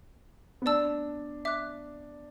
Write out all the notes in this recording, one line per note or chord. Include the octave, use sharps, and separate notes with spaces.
B3
D4 D5 A5 E6
E5 D6 F#6